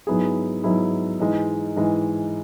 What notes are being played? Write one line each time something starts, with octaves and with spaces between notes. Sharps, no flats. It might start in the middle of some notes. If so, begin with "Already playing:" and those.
G#2 F#3 B3 E4 G#4
G#2 F#3 B3 E4 G#4
G#2 E3 G#3
G#2 E3 G#3